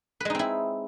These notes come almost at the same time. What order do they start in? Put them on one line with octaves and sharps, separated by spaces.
B4 G#3 D#4 C4 E4